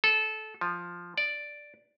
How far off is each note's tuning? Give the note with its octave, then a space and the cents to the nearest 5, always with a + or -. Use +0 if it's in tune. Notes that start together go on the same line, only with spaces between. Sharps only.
A4 -20
F3 +0
D5 +0